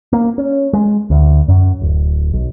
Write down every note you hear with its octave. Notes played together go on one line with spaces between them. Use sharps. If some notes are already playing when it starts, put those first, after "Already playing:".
A#3
C#4
G#3
D2
F#2
D1
B1